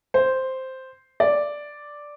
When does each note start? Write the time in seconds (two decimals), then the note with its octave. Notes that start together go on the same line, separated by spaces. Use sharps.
0.14 C5
1.20 D5